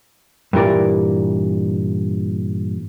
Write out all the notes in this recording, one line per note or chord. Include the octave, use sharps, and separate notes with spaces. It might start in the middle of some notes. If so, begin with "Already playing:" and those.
G2 A#2 E3 A#4 D5